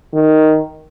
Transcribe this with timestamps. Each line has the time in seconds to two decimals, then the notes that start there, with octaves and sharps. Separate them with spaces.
0.13 D#3